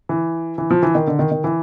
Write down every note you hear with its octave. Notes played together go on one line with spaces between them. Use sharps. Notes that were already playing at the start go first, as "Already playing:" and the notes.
E3
E3
F3
E3
D#3
D3
D#3
D#3
E3